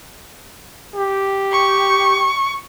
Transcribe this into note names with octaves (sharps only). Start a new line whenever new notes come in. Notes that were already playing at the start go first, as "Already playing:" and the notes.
G4
C#6